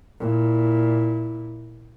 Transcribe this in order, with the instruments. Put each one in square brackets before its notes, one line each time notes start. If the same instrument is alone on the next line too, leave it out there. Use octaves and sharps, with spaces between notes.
[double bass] A#2 E4